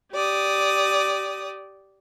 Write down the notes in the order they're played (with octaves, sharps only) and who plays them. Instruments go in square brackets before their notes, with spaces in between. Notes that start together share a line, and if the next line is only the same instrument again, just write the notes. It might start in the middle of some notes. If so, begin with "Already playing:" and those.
[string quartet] G4 D5 D#6